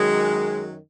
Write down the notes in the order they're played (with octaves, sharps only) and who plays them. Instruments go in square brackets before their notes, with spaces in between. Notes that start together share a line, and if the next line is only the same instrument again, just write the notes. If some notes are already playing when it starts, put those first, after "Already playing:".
Already playing: [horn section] F#2 D#3 F#3 G#3